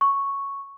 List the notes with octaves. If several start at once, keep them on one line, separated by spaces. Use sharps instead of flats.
C#6